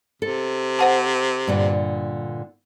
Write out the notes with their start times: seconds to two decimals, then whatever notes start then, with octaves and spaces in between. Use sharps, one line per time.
0.22 C3 A4
0.79 C5 F#5 A5
1.47 G2 A#2 D3